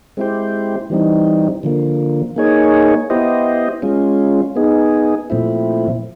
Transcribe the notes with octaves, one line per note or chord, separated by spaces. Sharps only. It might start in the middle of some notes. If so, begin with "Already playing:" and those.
G#3 C4 E4 G4 C5
E3 G3 C4 D#4
D3 F3 A#3
A#3 D#4 G#4 C#5
B3 E4 G4 C5 D#5
G#3 C#4 F4
B3 D#4 G#4
A#2 F3 A3 C4 E4